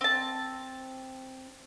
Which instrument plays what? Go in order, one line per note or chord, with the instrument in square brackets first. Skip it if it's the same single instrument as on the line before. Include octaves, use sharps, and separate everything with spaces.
[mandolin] C4 A5